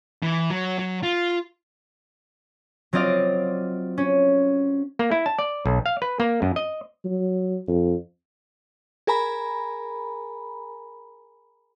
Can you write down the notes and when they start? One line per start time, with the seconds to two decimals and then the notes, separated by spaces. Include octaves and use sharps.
0.23 E3
0.50 F#3
0.79 F#3
1.03 F4
2.93 F#3 C4 F4 D5 D#5 F5
3.98 C#4
4.99 A#3
5.11 E4
5.26 A5
5.39 D5
5.66 B1
5.86 F5
6.02 B4
6.20 A#3
6.42 F#2
6.56 D#5
7.05 F#3
7.68 F2
9.07 G#4 A#4 G#5 A#5 B5